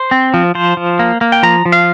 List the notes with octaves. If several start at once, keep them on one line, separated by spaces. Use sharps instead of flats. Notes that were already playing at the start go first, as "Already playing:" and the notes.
Already playing: C5
C4
F3
F3 C5
F3
A#3
A#3
G5
F3 A#5
F3
F5